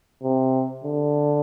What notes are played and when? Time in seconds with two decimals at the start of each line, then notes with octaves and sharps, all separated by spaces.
0.23 C3
0.84 D3